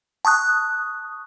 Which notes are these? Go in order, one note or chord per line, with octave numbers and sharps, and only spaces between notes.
A5 C#6 D#6 F#6